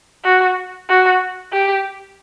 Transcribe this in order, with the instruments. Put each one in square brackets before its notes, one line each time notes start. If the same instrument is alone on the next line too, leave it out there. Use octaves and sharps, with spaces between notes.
[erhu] F#4
F#4
G4